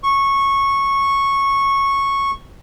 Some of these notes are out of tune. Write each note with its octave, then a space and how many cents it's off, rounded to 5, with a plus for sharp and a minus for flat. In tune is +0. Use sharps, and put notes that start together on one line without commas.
C#6 -10